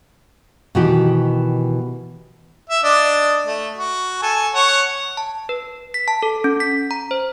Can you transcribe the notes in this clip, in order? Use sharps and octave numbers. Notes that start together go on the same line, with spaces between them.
B2 D#3 E3 F#4 G4
E5
D4 D5 D#5
A3
F#4
A4 G#5
C#5 F#5
A5
B4
B6
A5
A4
C#4
B6
A#5
C5